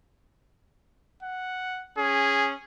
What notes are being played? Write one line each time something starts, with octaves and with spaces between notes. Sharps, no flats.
F#5
C#4 G#4